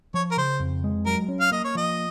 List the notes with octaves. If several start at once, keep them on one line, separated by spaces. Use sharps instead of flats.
F3 C#5
A#4
C#3 C5
F2
G#3
F#3 A#4
C#4
F5
A#3 D#5
C#5
F3 D#5